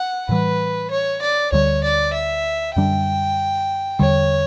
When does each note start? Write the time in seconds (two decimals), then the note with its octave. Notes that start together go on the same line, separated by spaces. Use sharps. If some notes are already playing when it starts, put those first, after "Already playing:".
Already playing: F#5
0.29 A2 E3 G3 B4
0.91 C#5
1.22 D5
1.52 D2 D3 G3 C#5
1.84 D5
2.14 E5
2.76 F#2 D3 G3 D4 G5
3.99 E2 D3 G3 C#5